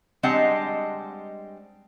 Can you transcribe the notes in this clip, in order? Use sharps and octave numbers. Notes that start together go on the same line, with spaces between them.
G3 G#3 C4 D4 D#5 F#5